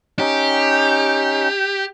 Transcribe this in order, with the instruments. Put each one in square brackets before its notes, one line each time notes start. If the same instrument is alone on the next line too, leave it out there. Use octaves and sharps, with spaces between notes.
[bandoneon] C#4 D#4 [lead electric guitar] G4